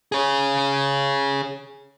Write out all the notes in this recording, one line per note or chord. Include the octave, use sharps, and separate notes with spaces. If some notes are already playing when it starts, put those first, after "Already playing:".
G#4 C#5